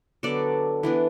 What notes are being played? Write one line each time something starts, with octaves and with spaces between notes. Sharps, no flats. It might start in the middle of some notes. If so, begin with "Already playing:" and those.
D3 F#3 B3 D4 A4 D5
E3 B3 D4